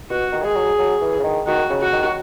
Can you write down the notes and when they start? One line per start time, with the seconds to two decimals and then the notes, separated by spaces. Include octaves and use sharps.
0.10 B2 F#4
0.32 D#3
0.44 G#3 G#4
0.56 F#3
0.79 F#3
1.01 E3
1.19 C#3
1.24 D#3
1.47 D#3 F#4
1.70 C#3
1.81 F#4
1.93 D#3